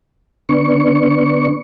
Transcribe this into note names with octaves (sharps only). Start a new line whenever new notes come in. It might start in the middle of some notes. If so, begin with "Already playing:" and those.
D3 B3 D4 C#6